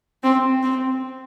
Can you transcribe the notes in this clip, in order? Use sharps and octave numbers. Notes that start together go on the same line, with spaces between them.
C4
C4